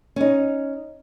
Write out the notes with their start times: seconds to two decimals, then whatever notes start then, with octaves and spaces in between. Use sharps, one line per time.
0.16 C#4 D#4